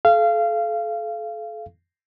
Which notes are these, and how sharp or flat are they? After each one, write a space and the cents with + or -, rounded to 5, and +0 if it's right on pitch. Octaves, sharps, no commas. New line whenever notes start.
A4 -35 F5 -25